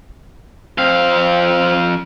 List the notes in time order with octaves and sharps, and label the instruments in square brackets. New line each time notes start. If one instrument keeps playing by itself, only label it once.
[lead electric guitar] F2 F5 [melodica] C4